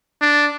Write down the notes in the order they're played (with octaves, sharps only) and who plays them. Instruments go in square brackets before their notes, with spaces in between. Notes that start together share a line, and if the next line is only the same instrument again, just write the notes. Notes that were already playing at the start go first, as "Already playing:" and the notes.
[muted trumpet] D4